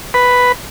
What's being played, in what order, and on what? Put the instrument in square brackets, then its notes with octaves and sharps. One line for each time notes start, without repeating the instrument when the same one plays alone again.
[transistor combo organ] B4